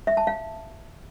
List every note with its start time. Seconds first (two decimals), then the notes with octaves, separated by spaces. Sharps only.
0.07 E5
0.17 A5
0.27 F5